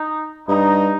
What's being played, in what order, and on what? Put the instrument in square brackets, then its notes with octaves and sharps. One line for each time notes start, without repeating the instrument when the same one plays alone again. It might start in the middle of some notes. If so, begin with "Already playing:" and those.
Already playing: [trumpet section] D#4
[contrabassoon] G2 [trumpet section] D#4